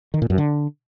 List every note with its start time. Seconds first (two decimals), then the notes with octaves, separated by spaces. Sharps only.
0.14 D#3
0.22 A#2
0.30 F#2
0.38 D3